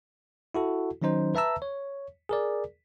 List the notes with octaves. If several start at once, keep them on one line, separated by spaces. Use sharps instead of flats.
E4 F#4 A4
D#3 F#3 C#4 D#4 C5
B4 E5 A5 A#5 E6
C#5
G#4 A#4 D5